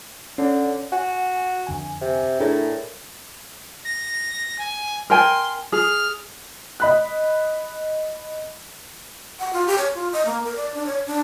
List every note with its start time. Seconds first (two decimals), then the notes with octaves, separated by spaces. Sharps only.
0.38 D3 C#4
0.92 F#4 F#5 G#5
1.67 F2 D3 G#5
2.01 C3
2.40 A2 D4 G#4 A#4
3.85 A#6
4.59 G#5
5.10 A#4 G5 G#5 C6
5.72 G#4 F6
6.80 D#5 B5 F#6
9.39 F#5
9.53 F4
9.67 G4
9.78 C#5
9.94 F4
10.13 D#5
10.26 A#3
10.44 A#4
10.56 D5
10.74 D4
10.87 C#5
11.07 D4